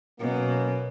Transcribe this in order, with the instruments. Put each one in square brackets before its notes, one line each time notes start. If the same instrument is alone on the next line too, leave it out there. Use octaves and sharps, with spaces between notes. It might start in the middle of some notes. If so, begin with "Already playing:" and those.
[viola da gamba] B2 [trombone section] F#3 A#3 C#4 F#4 B4